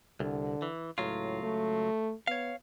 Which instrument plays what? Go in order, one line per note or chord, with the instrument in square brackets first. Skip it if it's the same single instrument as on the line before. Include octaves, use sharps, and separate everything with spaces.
[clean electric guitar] C2 [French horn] D3
[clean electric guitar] E3
[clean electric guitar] C#2 F#3 F4 [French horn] A2
[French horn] A3
[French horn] B3 [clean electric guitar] C#5 F5